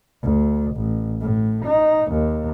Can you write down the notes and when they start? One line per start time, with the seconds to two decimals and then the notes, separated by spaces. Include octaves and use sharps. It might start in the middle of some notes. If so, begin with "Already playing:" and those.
0.23 D2
0.76 A1
1.21 A2
1.65 D#4
2.12 D#2